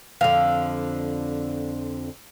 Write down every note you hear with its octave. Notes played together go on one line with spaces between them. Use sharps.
F2 D3 F5